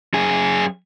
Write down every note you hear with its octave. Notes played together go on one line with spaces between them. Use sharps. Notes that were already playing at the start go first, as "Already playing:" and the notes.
F#2 G#4